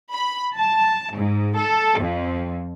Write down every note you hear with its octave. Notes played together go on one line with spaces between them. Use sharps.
B5
A5
G#2
A4
F2